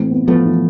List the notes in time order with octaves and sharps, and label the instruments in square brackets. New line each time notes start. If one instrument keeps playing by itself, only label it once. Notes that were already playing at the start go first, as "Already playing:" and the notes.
Already playing: [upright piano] A2 E3 [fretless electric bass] C4
[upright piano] B3
[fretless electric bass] F3 A3 [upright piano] B3
[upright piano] E3